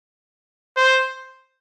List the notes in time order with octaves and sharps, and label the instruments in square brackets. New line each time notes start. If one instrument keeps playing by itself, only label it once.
[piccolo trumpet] C5